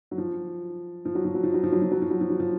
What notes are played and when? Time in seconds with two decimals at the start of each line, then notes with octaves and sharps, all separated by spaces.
0.11 F#3
0.18 F3
1.05 F3
1.15 F#3
1.25 F3
1.35 F#3
1.43 F3
1.54 F#3
1.63 F3
1.72 F#3
1.82 F3
1.92 F#3
2.02 F3
2.11 F#3
2.21 F3
2.30 F#3
2.39 F3